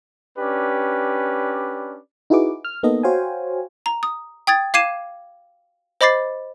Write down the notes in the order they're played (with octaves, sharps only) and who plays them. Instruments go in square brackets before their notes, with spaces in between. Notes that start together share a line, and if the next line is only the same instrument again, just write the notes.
[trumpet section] C#4 D4 G4 B4 D5
[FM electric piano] D#4 E4 F#4 G#4 B4 D6
F6
A#3 B3 D#4 A4 D#5
F#4 C5 C#5 F5 G5 G#5
[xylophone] A#5
D#6
G5 D#6 G#6 A6
F5 D6 G#6 C7 D#7 E7
C5 D#5 B5 D6 A6 C7